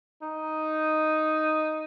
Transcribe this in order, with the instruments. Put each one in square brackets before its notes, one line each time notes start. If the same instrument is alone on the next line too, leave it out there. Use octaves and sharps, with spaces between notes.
[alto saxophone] D#4